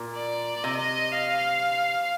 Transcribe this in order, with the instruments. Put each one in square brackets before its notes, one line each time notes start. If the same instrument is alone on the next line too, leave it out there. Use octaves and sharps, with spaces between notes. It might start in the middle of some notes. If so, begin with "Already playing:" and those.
Already playing: [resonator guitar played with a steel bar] A#2
[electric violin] D5
[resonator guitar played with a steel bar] C3 [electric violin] D#5
[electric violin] F5